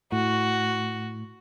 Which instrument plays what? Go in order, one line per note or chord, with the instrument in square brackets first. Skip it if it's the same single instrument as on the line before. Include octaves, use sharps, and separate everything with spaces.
[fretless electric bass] A2 [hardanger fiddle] F#4